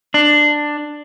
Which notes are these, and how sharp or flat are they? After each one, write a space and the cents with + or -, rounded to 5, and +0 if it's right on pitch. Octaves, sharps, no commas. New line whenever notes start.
D4 +10